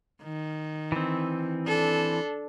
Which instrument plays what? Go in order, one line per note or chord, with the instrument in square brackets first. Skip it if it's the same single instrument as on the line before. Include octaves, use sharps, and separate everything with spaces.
[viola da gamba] D#3
[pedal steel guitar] E3 C4
[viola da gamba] D4 A4